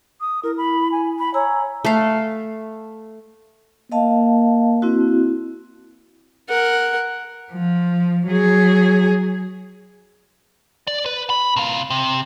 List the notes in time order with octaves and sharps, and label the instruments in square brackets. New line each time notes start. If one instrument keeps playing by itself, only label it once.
[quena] D#6
[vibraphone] E4 [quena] A#4
[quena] B5
G#5
B5
[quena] C#5 [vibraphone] G#5 A#5 E6
[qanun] A3 F5
[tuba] A#3 [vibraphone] D#5 F5 A5
[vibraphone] C4 E4 F#4
[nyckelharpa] A#4 F#5
[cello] F3
F#3 G#4
[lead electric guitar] D5
B4
B5
C3 F5
C3